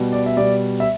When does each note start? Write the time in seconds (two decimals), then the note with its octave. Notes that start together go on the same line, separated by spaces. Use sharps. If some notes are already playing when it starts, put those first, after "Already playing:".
Already playing: B2 G3
0.13 D5
0.26 E5
0.37 B2 G3 D5
0.80 E5